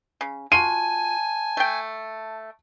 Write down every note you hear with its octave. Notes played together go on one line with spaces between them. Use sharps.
C#3
F4 F#4 G#5 A5 D#7
A3 G5